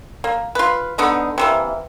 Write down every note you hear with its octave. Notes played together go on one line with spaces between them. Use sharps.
A#3
F4 B4
D3 B3 D#4
C3 E3 A#3